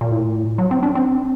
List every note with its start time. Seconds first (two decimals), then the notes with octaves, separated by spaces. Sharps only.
0.01 A#2
0.11 A2
0.58 F#3
0.71 C4
0.83 D4
0.95 C4